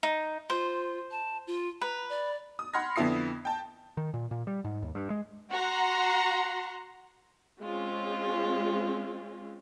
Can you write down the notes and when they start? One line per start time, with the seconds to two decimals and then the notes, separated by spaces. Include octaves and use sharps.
0.03 D#4
0.50 F4 C5
1.11 A5
1.47 F4
1.81 B4 A#5
2.09 D5
2.59 D#6
2.74 F#5 B5 C6 F6 G#6 A#6
2.96 F2 D3 B3 E4 D#6 C7
3.45 G5 A5
3.97 D#3
4.14 A#2
4.31 A#2
4.47 G3
4.64 G#2
4.83 D#2
4.95 G2
5.10 G#3
5.51 F#4 F#5 A#5 C6
7.60 G#3 C4 C#4 F4